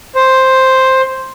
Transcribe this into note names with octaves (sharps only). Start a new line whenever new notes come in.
C5